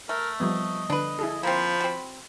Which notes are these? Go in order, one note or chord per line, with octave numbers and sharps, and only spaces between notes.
A3 A#4
F3 G3 B3 D#5
D3 D4 B4
E4 G#4 A4
F3 A#3 C4 B5
C4 F#4